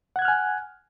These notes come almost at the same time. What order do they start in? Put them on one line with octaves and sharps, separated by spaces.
F#5 G#6 F#6 F6 G#5